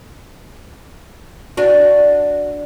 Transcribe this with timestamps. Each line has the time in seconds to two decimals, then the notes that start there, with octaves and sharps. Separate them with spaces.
1.57 D4 F#4